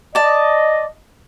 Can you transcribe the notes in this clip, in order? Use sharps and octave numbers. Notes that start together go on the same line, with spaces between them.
D5 D#5 A5